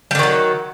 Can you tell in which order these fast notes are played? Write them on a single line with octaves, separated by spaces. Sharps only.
G3 D3 D#3 F#3